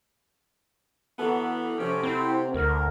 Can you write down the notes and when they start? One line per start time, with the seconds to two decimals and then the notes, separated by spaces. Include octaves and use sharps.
1.19 E3 F#3 B3 A4
1.78 C3 F3 C#4 G4
2.03 C4 E4 C5
2.54 D2 A#4